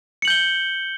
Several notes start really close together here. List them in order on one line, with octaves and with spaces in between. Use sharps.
C#7 F#7 G6 G7